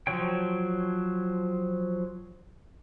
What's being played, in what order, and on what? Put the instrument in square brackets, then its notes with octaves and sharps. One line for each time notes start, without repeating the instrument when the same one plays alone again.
[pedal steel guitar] F3 F#3 C#5 G5